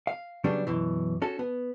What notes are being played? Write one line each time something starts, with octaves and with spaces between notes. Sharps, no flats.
F5
C#3 F#3 G3 B3 C#4 D4
F#2 B2 E3
C#4 F#4 A4
B3